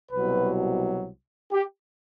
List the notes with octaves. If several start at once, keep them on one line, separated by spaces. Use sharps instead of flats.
C2 B2 F#3 B4
G4